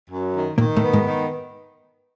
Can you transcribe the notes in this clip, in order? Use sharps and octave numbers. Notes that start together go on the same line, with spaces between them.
F#2
D#3
A#2 D#3 A#3
A2 A3
B3
G#2 G#3
D#3